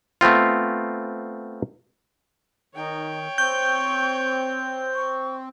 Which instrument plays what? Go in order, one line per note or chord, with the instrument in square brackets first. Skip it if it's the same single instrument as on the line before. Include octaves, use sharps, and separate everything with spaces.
[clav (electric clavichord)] A3 B3 C4 F4
[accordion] D#3 [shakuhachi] D#4 [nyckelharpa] C#5 G5
[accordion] C4 [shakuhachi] C#6 [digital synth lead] G6
[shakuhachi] C#6